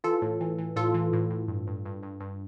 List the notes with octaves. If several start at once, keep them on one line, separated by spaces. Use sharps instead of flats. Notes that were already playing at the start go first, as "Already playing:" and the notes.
E3 F4 A4
A2
E3
E3
A2 F4 A4
E3
A2
A2
G2
G2
G2
G2
G2